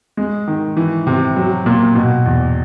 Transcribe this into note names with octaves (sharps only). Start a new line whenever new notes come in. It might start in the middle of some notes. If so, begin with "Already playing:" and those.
G#3
D#3
E3
C3
F#3
A#2
B2
E2